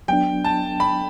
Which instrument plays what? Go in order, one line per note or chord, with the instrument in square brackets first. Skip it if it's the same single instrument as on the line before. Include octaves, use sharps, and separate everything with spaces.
[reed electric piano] F#3 B3 D4 [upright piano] G5
[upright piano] A5
B5